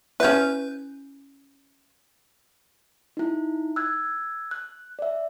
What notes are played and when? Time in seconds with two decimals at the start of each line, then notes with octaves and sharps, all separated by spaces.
0.20 C#4 E4 B4 G6
3.17 D#4 E4
3.76 E6 F#6 G#6
4.51 F#6
4.99 D5 E5